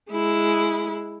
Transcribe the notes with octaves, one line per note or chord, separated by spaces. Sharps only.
G#3 E4